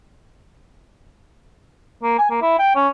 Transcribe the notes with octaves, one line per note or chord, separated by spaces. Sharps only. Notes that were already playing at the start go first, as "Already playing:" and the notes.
A#3
G#5
A#3
E4
G5
C#4